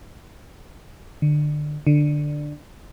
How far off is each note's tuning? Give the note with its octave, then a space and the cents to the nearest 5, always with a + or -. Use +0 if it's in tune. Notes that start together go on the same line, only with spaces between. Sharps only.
D3 +25
D3 +10